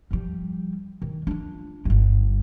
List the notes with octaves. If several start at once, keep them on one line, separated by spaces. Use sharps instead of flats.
F3 G3
D#3
D4 F4
G1 G2